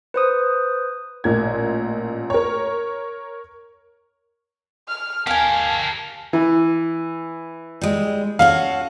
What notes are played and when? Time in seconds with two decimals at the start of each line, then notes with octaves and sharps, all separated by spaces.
0.14 B4 C5 D#6
1.24 A1 A#2 G#6
2.30 A#4 C#5
4.88 F6
5.27 G4 A#4 F5 G#5 A5
6.33 E3
7.81 G3 G#3
8.39 C#4 F#4 A4 F5